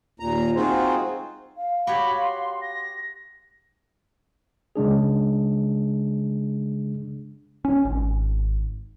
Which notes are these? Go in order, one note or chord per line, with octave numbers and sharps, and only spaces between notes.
D#2 A#2 A#5
C4 D#4 F4 F#4 G#4 C5
F5
F#4 G4 C#5 B5
C6
A#6
C#3 G#3 D4 G#4
C#4
G#1